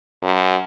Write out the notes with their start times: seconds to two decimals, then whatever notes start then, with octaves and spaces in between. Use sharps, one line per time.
0.22 F#2